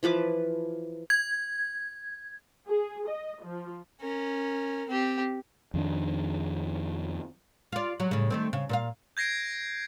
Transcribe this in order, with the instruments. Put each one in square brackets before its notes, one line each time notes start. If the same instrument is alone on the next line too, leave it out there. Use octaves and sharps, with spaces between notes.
[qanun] E3 F3 B4 D6
[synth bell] G#6
[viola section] G#4
D#5
F3
[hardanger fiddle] C#4 A#4
C4 G4
[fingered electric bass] F2 D#3 D4
[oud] F4 D5
F#3
A2 C#3
D#3 A3 C4
C#3
A#2 C5 F5
[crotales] G6 G#6 A#6 C7 D7